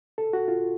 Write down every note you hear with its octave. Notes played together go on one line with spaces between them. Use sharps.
A4
F#4
F4